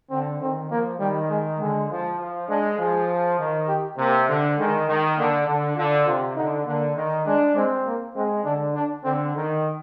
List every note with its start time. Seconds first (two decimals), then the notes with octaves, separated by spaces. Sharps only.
0.10 D3 C4
0.40 D#3 C4
0.70 F3 A#3
1.00 D#3 G3
1.30 G#3
1.60 D3 G#3
1.90 F3
2.19 F3
2.49 G#3 D4
2.78 F3 G#4
3.39 D#3
3.68 G4
3.98 C3 A#3
4.28 D3
4.58 D#3 G#3
4.88 D#3
5.17 D3 A#3
5.46 D3 D4
5.76 D3 F4
6.06 C3 F4
6.36 D3 D#4
6.66 D3 A#3
6.95 D#3
7.26 G#3 D4
7.55 G#3 C4
7.86 A#3
8.16 G#3 C4
8.44 D3 D4
8.75 D4
9.04 D3 C4
9.35 D#3